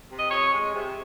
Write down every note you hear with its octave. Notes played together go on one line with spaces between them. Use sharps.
C3
D#5
F2 C#5
G#3
C3